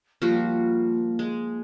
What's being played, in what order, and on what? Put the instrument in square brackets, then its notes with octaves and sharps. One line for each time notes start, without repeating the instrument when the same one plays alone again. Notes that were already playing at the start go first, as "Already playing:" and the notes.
[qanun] F3 G3 F#4 [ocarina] A#3
[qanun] G#3